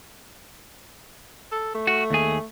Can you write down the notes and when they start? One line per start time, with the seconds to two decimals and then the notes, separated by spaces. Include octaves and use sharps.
1.52 A4
1.75 A3
1.87 F#4
2.10 D#2 G#4